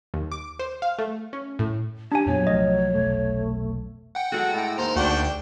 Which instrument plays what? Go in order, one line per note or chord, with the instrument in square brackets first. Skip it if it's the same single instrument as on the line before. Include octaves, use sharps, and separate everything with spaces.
[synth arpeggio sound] D#2
D6
C5
F5
A3
C#4
A2
[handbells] D4 G#5 [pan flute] G4
[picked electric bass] F2 A#2 B3 [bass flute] F#3 [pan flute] C#5
[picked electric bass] C2 F3 A3 [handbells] D#5
[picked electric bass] F1 B1 [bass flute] A3
[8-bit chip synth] F#5 G5
[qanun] G#3 A4 [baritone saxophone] F#4
[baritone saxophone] A2
[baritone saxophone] D#2 [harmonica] C5 [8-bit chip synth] A#5
[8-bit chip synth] D2 [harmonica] D4 F#4 G5